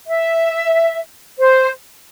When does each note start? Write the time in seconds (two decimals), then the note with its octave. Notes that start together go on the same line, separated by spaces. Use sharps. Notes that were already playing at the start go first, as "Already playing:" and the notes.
0.07 E5
1.39 C5